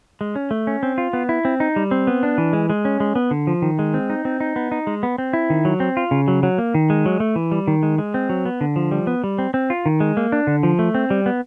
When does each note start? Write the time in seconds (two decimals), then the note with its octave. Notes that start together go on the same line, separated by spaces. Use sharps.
0.21 G#3
0.36 C#4
0.51 A3
0.67 C#4
0.83 C4
0.98 F4
1.13 B3
1.29 E4
1.45 C4
1.60 D#4
1.76 G3
1.91 C4
2.07 B3
2.23 D4
2.38 E3
2.53 G#3
2.70 G#3
2.85 C#4
3.00 G#3
3.16 B3
3.31 D3
3.47 F3
3.62 D#3
3.79 G#3
3.94 C4
4.10 D#4
4.25 C4
4.40 D#4
4.56 B3
4.72 D#4
4.87 G#3
5.03 B3
5.18 C4
5.33 E4
5.50 D#3
5.65 F#3
5.80 C4
5.97 F4
6.11 C#3
6.28 F#3
6.43 F#3
6.58 A#3
6.74 D#3
6.90 G#3
7.06 F#3
7.20 A3
7.36 E3
7.52 G3
7.68 D#3
7.83 G#3
7.98 G#3
8.14 C4
8.29 F#3
8.45 B3
8.61 D3
8.76 F3
8.91 G3
9.07 B3
9.24 G3
9.39 C4
9.54 C4
9.70 F4
9.86 D#3
10.00 G#3
10.17 A#3
10.32 D4
10.47 D3
10.63 F3
10.79 A3
10.94 C4
11.10 G3
11.26 B3